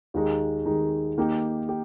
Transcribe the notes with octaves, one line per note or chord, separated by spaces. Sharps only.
D#2 D#3 G#3 D#4
D#2 D#3 G#3 D#4
D#3 A#3 D#4 G4
G4